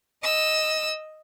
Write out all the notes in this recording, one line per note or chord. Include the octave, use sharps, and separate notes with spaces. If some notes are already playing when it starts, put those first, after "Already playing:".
D#5 E6